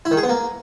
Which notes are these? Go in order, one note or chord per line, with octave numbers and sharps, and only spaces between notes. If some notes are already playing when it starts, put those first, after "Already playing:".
E4
D#3
G#4
B3
A#3